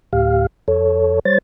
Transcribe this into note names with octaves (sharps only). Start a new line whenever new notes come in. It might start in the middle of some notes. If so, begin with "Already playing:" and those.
D2 A2 G4 F5
F2 A4 C#5
G3 C5 C#5 A6